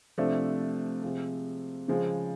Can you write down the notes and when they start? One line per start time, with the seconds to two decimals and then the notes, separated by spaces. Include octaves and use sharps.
0.18 C3 F3 A3 D4
1.03 C3 F3 G#3
1.88 C#3 F3 G#3